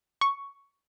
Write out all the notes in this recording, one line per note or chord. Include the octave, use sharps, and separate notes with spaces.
C#6